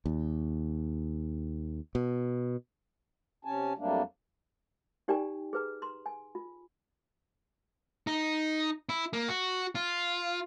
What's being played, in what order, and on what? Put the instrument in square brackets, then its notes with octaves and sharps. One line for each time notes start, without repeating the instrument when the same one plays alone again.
[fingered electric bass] D#2
B2
[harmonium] C3 C#4 G#5 A5
F2 F#3 G3 A3 A#3 D4
[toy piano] D#4 G4 D5 G5 G#5 A#5
G#4 B4 A#5
A#5 C6
G#5
F4
[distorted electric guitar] D#4
E4
A#3
F#4
F4